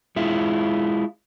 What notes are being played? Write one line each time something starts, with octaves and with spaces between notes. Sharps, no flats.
G#3 E4 F4